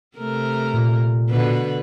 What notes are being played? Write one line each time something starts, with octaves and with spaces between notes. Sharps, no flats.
C3 A3 A#4
A#2
B2 D3 B4